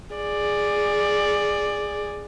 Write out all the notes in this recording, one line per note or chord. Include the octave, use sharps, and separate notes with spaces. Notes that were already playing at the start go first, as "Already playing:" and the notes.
G#4 D5